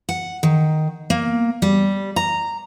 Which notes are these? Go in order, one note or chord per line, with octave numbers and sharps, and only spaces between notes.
F#5
D#3
A#3
G3
A#5